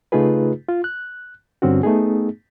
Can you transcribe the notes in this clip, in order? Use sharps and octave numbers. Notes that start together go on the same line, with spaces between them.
C#3 A3 D#4 F4 G#4 B4
F4
F#6
G2 D3 C4 C#4 F#4
A3 B3 D#4 G#4